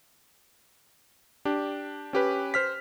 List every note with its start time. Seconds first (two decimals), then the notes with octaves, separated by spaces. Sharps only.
1.45 D4 G4
2.13 C#4 G4 B4
2.54 C5 F6 B6